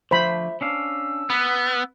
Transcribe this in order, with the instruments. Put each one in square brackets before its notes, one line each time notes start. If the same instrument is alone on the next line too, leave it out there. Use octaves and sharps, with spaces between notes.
[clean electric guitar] D3 F3 A3 [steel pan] C5 B5 [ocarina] E5
[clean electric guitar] C#4 D4 F5 [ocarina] E6
[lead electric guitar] B3 [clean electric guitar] B4